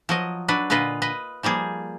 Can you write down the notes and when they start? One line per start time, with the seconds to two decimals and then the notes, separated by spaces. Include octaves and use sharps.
0.09 F3 F#3 D#5
0.48 F#3 D4 B4
0.70 A#2 D3 F4 B4 D#5
1.02 B4 D#5
1.43 F3 G3 A#3 G#4